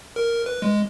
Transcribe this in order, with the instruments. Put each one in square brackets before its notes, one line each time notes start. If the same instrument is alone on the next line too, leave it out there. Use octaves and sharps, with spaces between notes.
[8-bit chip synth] A#4
B4
G#3